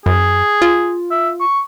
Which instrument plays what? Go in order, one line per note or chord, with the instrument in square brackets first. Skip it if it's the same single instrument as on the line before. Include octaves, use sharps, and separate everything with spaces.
[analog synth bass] F#2 [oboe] G#4
[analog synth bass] F4
[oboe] E5
C#6